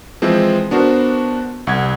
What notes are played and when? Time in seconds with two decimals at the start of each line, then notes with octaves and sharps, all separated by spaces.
0.22 E3 F3 G#3 C4
0.71 B3 D4 F#4 A#4 C5
1.67 C2 F#5 G#6